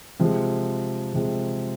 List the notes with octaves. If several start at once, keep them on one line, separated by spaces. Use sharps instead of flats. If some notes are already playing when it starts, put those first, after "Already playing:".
C3 F3 G#3
C3 F3 G#3